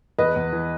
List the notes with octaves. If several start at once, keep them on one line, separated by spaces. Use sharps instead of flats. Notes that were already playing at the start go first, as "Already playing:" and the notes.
E2 B4 D#5
E2
E3